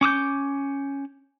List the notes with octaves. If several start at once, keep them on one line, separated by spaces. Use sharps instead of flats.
C#4 D6 D#6 G6